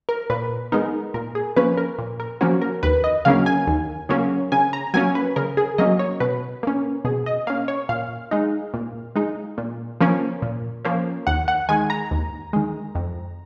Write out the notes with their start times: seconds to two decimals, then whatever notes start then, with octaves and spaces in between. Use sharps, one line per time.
0.09 A#4
0.30 A#2 B4
0.72 G#3 B3 D#4 A#4
1.14 A#2 A#4
1.35 G#4
1.56 F3 A#3 C#4 B4
1.77 A#4
1.98 A#2
2.20 A#4
2.41 F3 A#3 C#4 F#4
2.62 A#4
2.83 D#2 B4
3.04 D#5
3.25 C#3 F#3 A#3 C#4 F5
3.46 G#5
3.67 D#2
4.09 C#3 F#3 A#3 C#4
4.52 C#3 G#5
4.73 A#5
4.94 F#3 A#3 C#4 G#5
5.15 B4
5.36 C#3 A#4
5.57 G#4
5.78 F#3 A#3 C#4 D#5
5.99 C#5
6.20 B2 B4
6.63 A#3 C#4
7.05 B2 G#4
7.26 D#5
7.47 A#3 C#4 F5
7.68 C#5
7.89 A#2 F5
8.31 G#3 D#4
8.74 A#2
9.16 G#3 D#4
9.58 A#2
10.01 F3 A#3 C#4
10.42 A#2
10.85 F3 A#3 C#4
11.27 D#2 F#5
11.48 F#5
11.69 D#3 G#3 G#5
11.90 A#5
12.11 D#2
12.53 D#3 G#3
12.95 F2